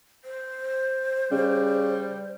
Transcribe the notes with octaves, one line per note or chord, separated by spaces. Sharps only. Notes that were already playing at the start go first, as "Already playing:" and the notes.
C5
C#3 G3